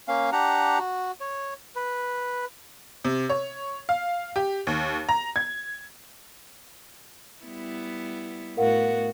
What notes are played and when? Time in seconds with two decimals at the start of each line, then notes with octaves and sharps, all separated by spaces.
0.08 A#3 C#4 F5
0.32 D4 G4 F#5 A#5
0.79 F#4
1.20 C#5
1.76 B4
3.05 C3
3.30 C#5
3.89 F5
4.36 G4
4.67 D#2
5.09 A#5
5.36 G#6
7.43 G3 B3 E4
8.57 A2 B3 F#4 A#4 F5 F#5